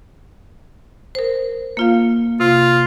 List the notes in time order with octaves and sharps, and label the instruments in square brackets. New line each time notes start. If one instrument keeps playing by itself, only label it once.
[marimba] A#4 C5
A#3 F4 F5
[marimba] C3 [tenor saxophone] F4